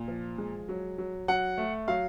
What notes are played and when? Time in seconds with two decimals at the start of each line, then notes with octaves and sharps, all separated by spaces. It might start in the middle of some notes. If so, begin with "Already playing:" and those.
Already playing: A#2
0.08 F3
0.38 G#3
0.69 F#3
0.98 F#3
1.28 F#3 F#5
1.58 A3
1.88 F#3 F5